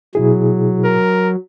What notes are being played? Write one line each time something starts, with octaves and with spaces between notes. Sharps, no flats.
B2 F#3 E4 G#4
A#4